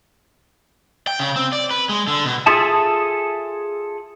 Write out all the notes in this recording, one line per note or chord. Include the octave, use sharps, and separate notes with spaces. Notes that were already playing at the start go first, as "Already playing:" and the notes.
G5
C#3
C4
D5
B4
G#3
D3
B2
F4 G#4 A4 E5 A5